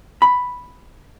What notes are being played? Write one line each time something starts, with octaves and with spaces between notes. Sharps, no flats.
B5